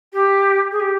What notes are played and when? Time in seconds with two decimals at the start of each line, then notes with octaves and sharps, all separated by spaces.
0.13 G4
0.71 G#4
0.80 G4